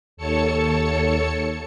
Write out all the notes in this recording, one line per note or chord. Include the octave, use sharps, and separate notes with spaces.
D#2 A4 C#5 A5 C#7